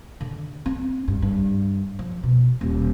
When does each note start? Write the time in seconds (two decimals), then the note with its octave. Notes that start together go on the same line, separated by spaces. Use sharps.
0.21 D3
0.66 C4
1.08 G2
1.22 G2
1.99 F3
2.23 B2
2.61 D#1